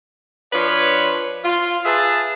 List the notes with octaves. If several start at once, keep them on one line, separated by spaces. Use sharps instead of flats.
F3 D4 B4 C#5
F4
G#4 B4 E5 F5 A5